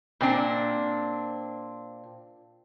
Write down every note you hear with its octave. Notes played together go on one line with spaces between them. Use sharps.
A#2 C4 D4